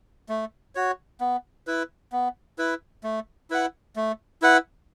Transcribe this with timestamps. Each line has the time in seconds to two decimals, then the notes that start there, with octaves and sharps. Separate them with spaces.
0.29 A3
0.75 F#4 C#5
1.21 B3
1.67 E4 B4
2.12 B3
2.58 E4 B4
3.04 A3
3.50 E4 B4 F#5
3.96 A3
4.42 E4 B4 F#5